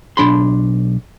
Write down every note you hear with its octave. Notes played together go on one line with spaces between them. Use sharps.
B1 G#2 D4 B5 C6